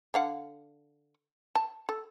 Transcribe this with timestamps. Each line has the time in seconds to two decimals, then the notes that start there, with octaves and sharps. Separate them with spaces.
0.14 D3 F5 F#5
1.55 A5
1.89 A4